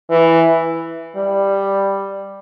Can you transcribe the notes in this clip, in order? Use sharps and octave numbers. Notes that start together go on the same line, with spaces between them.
E3
G3